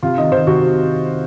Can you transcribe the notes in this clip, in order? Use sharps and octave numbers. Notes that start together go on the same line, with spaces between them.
C3 F4
D#3 D#5
C3 C5
C3 F#4